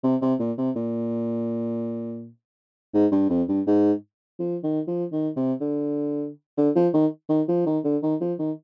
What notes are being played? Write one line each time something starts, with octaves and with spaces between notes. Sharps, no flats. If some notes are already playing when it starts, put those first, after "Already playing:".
C3
C3
A#2
C3
A#2
G#2
G2
F2
G2
G#2
F3
D#3
F3
D#3
C3
D3
D3
F3
D#3
D#3
F3
D#3
D3
D#3
F3
D#3